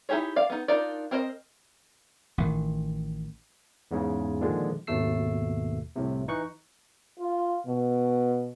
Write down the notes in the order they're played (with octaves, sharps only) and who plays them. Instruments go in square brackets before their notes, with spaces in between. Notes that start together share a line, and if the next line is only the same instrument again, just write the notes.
[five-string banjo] D#4 E4 G4 G#4 C#5
D5 F5
B3 D#4
D4 D#4 F4 A#4 D5
C4 A#4 C5 C#5 D#5
[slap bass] A1 D#3
[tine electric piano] E2 G#2 C#3
A#2 D3 D#3 F3 G#3
G#1 D#2 B2 A3 E6 C7
C2 A2 C3
E3 D#4 C#6 F#6
[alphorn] F4
B2